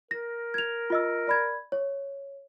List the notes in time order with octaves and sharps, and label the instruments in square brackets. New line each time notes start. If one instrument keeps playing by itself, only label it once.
[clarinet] A#4 [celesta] A#6
[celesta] G#6 F7
F4 D#5 E6
D5 B5 G#6
C#5